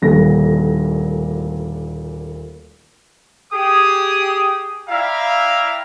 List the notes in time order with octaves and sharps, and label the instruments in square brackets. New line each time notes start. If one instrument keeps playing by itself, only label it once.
[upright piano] D#1 D2 A#2 A#6
[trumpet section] G4 G#4 D#6
E4 D5 E5 F5 G5 A#5